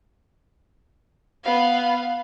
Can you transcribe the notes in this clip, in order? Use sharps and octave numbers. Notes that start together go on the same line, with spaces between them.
B3 F5